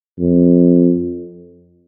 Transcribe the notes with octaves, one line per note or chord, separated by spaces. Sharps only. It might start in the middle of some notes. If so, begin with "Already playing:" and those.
F2